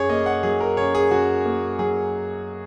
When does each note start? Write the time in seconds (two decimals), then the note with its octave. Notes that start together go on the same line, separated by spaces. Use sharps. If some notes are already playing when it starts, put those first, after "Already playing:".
Already playing: F#2 G#4 C#5
0.09 A#3 D#5
0.26 F#5
0.43 F#3 G#4
0.60 A#4
0.77 F#2 C#5
0.95 G#4
1.11 F#2 F#4
1.45 A#3
1.79 F#3 G#4